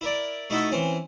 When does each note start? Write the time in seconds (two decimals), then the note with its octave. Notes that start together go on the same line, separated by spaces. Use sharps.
0.01 E4 A#4 D5
0.50 A3 D#4 E4 F#4 A4 E5
0.72 E3 C4 C#4